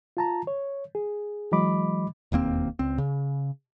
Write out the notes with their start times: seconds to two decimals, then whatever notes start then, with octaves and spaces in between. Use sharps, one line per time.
0.17 F4 A5 A#5
0.47 C#5
0.95 G#4
1.52 E3 F#3 G#3 D#5 B5 D6
2.32 E1 D#2 A#3 C4
2.79 C#2 C4
2.98 C#3